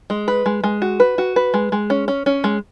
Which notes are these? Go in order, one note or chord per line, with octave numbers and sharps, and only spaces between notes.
G#3
B4
G#3
G#3
F#4
B4
F#4
B4
G#3
G#3
C#4
C#4
C#4
G#3